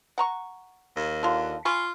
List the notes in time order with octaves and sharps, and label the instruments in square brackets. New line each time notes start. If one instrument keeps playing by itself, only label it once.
[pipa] F#5 A#5 C#6
[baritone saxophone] D#2
[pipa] D3 F4
[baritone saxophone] F4 [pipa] G#5 B5 C#6